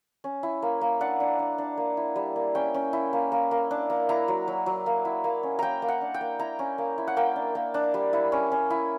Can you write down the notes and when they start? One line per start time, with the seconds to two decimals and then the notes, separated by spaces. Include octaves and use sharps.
0.24 C#4
0.43 E4
0.62 A#3
0.81 A#3
1.01 D4 F#5
1.20 D4
1.39 D4
1.58 D4
1.77 A#3
1.97 E4
2.16 G3
2.36 A#3
2.55 C#4 G5
2.74 C#4
2.93 E4
3.13 A#3
3.32 A#3
3.51 A#3
3.71 D4
3.90 A#3
4.09 E4 A#5
4.28 F#3
4.48 F#3
4.66 F#3
4.86 A#3
5.05 E4
5.24 A#3
5.43 C#4
5.59 A#3 G5 A#5
5.82 A#3
5.88 F#5
6.01 D4
6.14 G5
6.21 A#3
6.39 E4 A#5
6.59 C#4
6.78 A#3
6.98 E4
7.08 F#5
7.17 A#3 G5
7.36 D4
7.55 A#3
7.74 D4
7.94 G3
8.13 E4
8.32 C#4
8.52 C#4
8.70 E4